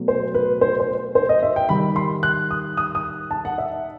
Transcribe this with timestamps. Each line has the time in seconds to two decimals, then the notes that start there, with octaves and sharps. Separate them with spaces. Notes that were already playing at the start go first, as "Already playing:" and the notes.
Already playing: B2 F#3 A3
0.08 C5
0.34 B4
0.61 C5
0.80 C5
1.15 C5
1.29 D#5
1.43 E5
1.56 G5
1.69 D#3 G3 B5
1.96 C6
2.23 F#6
2.51 D#6
2.77 D#6
2.95 D#6
3.31 A5
3.45 F#5
3.58 E5